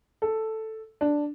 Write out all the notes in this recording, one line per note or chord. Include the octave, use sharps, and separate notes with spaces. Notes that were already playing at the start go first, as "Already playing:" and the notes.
A4
D4